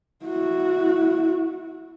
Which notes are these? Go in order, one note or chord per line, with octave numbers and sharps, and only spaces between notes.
E4 F#4